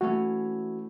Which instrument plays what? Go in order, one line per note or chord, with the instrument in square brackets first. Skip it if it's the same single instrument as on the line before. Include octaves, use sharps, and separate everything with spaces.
[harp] E3 A3 C#4 [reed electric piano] F#4